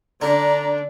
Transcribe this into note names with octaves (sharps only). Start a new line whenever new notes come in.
D3 D4 A#5